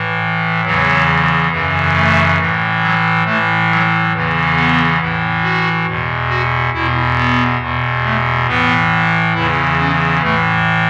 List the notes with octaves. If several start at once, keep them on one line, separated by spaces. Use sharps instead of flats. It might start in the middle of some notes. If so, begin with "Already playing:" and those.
Already playing: A2 E3
E2 C#3 E3 F#3
F#2 C#3 E3
A3
A2 E3
F#3
A2 E3 A3
F#3
E2 C#3 E3
B3
A2 E3
F#4
E2 B2
F#4
E2 B2 E4
B3
E2 B2
A3
A2 E3 B3
E2 C#3 E3 E4
C#4
A2 E3 A3